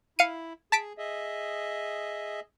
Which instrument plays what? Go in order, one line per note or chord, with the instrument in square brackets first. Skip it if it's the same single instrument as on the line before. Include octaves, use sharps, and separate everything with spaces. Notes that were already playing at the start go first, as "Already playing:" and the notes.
[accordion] E4 [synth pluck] F5 C#7 D#7
[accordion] G#4 [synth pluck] A5 B6 D7
[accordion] G#4 D#5 E5